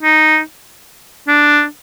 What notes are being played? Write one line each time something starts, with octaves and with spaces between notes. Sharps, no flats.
D#4
D4